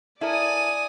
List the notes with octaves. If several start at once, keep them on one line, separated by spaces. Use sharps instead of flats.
E4 A4 A#4 D5 G#5 D#6